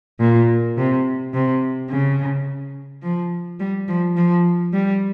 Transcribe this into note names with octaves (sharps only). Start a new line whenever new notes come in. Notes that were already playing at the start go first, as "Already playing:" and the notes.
A#2
C3
C3
C#3
F3
G3
F3
F3
G3